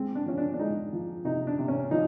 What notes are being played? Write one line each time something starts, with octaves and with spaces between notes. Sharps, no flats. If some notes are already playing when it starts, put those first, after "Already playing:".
Already playing: G#3 C4
D4
F3 C#4
D4
D4
G#3 D#4
F3
C3 D#4
D4
C3
C#4
F3 D#4